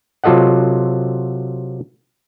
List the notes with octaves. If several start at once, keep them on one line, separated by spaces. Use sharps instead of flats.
C3 F#3 F4 A4 D#5 F#5